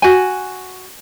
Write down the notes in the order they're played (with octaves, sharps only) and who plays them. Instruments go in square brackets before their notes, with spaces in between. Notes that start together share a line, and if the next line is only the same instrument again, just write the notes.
[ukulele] F#4 G#5